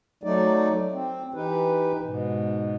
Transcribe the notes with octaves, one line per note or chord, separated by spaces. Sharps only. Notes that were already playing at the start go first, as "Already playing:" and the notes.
F#3 A3 D#4 D5
C4
E3 D#4 G4 B4
G#2 B2